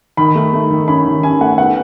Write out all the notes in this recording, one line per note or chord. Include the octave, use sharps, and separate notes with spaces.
D#3 B5
A3
A3
D#3
C#4 B5
D#3
C#4 G#5
A3 F#5
B3 F#5